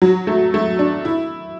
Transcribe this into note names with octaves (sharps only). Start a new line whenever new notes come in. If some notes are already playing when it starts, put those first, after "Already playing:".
F#3
A3
A3
D4
E4